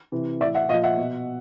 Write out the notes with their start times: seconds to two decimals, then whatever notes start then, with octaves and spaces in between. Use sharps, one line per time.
0.12 C3 E3
0.40 A2 E3 D5 E5
0.55 E5 F#5
0.69 A#2 D#5 F5
0.73 F3
0.84 E5 F#5
0.98 B2